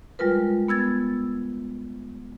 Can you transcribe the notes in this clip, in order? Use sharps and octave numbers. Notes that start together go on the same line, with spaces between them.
G3 G#3 F4 A#4 B4
B3 E6 G#6 A6